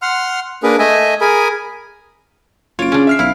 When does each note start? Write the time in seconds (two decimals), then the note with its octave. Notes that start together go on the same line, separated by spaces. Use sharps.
0.02 F#5 C6 F6
0.63 A#3 D4 G#4 A#4 B4
0.79 A3 D#5 E5 G#5
1.21 G#4 A#4 G#5 B5
2.79 F#1 F4 C#5 D7
2.92 C#3 C#4 D4
3.07 E5 F6 C7
3.19 B1 E4 F5 F6